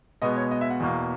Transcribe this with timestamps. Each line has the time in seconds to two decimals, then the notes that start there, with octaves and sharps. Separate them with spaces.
0.22 B2 G#3 B3 D#5
0.37 C#5
0.51 D#5
0.61 E5
0.70 F#5
0.80 E2 B2 A#3